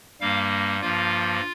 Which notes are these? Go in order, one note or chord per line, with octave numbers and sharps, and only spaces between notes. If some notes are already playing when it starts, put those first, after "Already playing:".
G2 G3 A#3 F5
G2 F3 A#3 F4